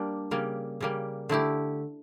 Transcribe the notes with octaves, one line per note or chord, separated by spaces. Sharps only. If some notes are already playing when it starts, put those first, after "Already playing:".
Already playing: G3 A#3 D4
C#3 G3 A#3
C#3 G3 A#3
D3 A3 E4 G4